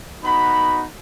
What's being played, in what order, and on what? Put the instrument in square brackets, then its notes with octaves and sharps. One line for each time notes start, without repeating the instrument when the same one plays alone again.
[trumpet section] B3 D#4 F#4 B5